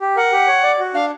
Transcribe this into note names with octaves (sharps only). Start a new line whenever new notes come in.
G4
A#4 F#5
G4
C#5
D5
F#4
D4 F5